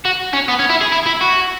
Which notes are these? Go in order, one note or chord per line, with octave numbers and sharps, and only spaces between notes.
F#4
C#4
B3
C#4
E4
G#4
E4
E4
F#4